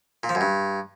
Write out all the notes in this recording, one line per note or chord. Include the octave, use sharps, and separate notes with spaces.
A#2
F3
F#2
G2